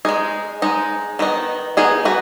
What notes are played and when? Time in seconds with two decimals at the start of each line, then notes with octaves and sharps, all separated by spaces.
0.05 G#3 D#4 G#4
0.62 G#3 D#4
1.19 D#3 B3 D#4
1.77 D#3 B3 D#4 G#4
2.05 F#4 B4